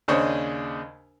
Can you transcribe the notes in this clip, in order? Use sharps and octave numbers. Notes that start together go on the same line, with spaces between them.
D#2 C#3 D4 C5 C#5 D#5